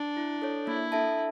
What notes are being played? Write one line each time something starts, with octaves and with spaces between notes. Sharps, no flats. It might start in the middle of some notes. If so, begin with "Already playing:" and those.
Already playing: D4
E4
A4 C#5
A#3 E4
D4 A4 E5 A5